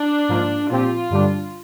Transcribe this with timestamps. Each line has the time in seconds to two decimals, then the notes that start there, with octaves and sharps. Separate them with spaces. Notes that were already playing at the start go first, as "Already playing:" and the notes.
Already playing: D4
0.29 G#2 F3 A#3 F4
0.70 A#2 F3 C4 F4 G4
1.10 G2 D3 G3 D4